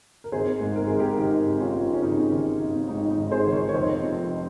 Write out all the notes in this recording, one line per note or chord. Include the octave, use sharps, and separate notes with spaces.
A#4
G#1 G#4 C5
G#2
A#4
G#1 G#4
G4 A#4
D#3 D#4 G4
G#1
C#4 F4
G#2
C#4
G#1 D#4
D#3
G#1
G#2 D#4
D#4
G#1
G#4 C5
D#3
A#4 C#5
C#5
F1 C5 D#5
F2